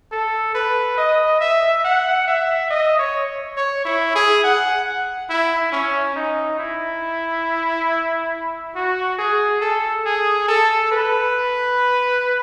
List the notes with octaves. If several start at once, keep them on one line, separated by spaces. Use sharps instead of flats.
A4
B4
D#5
E5
F#5
E5
D#5
C#5
C#5
E4
G#4
F#5
E4
C#4
D#4
E4
F#4
G#4
A4
G#4
A4
B4